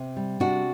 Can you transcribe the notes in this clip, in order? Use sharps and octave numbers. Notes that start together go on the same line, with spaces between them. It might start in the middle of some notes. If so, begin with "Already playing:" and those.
Already playing: C3
G3
C3 D4 F#4